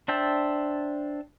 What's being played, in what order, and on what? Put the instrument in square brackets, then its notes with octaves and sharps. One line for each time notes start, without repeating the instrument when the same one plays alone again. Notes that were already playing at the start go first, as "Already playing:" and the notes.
[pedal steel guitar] D4 C5 E5 G5 A5